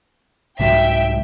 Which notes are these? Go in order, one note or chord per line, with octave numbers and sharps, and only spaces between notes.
C2 G#2 F#3 E5 G5